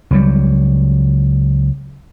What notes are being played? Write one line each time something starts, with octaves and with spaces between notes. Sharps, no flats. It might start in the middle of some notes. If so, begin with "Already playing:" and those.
C#2 F#3 G3